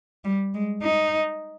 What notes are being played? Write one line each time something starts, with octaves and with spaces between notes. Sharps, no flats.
G3
G#3
D#4